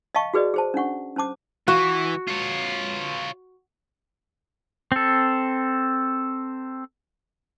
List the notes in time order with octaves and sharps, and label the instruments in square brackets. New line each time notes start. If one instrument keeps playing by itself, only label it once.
[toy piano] D#5 F5 G5 A5 C#6
F#4 G#4 B4 D5 D#5
G#4 C5 A5
C#4 D4 F#5 C#6
C#4 C5 A5 D6
[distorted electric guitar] E3 [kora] F#4
[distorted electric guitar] F4 C#5
[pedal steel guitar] C4 A4